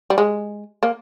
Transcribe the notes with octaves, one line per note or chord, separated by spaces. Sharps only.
G3
G#3
A#3